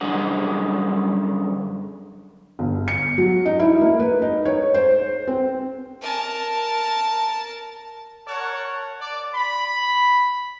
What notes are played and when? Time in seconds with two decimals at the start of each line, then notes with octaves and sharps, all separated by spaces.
0.01 F#2 D3 G3 D4 G#4 F#5
2.59 G1
2.88 C#7
3.18 F#3
3.46 D#4
3.59 E4
3.81 A#3
3.99 B4
4.22 D#4
4.45 C#5
4.74 C5
5.27 C4
6.01 A#4 A5
8.27 A#4 C#5 F#5 A5
9.00 D5
9.35 B5